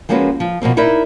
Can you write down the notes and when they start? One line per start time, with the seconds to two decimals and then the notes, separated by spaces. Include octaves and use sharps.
0.09 F3 G#3 A#3 C#4 F#4 B4
0.40 F3
0.62 B2 F3 A#3 C4
0.77 D#4 E4 A#4 D5 E5